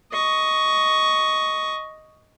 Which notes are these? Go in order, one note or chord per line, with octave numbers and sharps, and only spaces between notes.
D#5 C#6